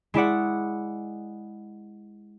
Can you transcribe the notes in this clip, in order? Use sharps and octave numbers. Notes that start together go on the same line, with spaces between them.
G#3 E4 D5 F#5